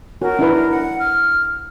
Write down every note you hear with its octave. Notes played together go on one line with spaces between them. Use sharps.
F#4 A#4 C#5
D4 E4 B4
F#5
F6